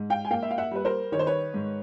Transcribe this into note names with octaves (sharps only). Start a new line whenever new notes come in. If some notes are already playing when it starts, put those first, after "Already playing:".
Already playing: G#2
F5 G5
G#5
A#3 F5 G5
E5
F5
E5 F#5
G3 B4
A#4 C5
D#3 C#5
C5
B4 C#5
G#2